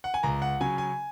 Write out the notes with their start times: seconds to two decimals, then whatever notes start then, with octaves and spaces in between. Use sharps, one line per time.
0.04 F#5
0.14 G#5
0.23 C#2 A#5
0.42 F#5
0.60 C#3 F#3 C#4 G#5
0.78 G#5